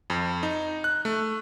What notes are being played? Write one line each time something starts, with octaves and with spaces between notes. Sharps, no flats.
F2
D#4
F#6
A3